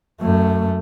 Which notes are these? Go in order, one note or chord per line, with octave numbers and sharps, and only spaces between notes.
F#2 A3